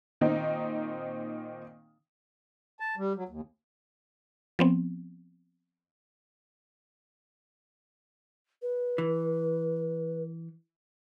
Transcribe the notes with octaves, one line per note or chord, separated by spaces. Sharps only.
A#2 D#3 C4 D#4 G5
A5
G3
F#3
D#2
F3 B3 C4
B4
E3